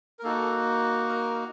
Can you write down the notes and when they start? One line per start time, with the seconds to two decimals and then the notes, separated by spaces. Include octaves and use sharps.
0.19 A#4
0.23 A#3 D#4 F#4 A4
1.09 A#4